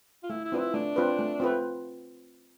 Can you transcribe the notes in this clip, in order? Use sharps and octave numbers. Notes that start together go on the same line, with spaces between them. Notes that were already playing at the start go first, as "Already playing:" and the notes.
F4
A3 E4
E4
C4 D4 F4 B4
E4
A3 D4
C4 F4 B4
A3
A3 C4 F4 B4